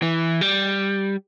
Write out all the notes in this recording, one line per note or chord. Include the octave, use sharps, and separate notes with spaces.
E3
G3